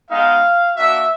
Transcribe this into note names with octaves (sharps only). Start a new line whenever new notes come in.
G#3 B3 D#4 F5
A#3 D4 F#4 E5